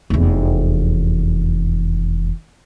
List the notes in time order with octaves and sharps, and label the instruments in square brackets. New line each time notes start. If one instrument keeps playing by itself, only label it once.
[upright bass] F1 E2